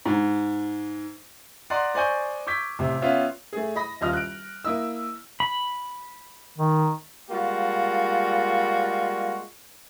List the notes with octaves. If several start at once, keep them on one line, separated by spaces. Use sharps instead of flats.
G#2
D5 D#5 F#5 A#5 C6 F#6
C5 D5 D#5 G#5 C#6 G6
C#6 D6 E6 G6 G#6 B6
A1 C3 E5
B3 C#4 F4 E5 F5
A3 G#4
D#5 B5 A#6
D#1 F4 D#5 F6
F#6 D7
A#3 E4 D#5 E6
B5
D#3
G3 G#3 A#3 F4 F#4